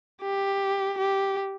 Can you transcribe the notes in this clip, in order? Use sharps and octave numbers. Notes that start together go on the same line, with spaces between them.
G4
G4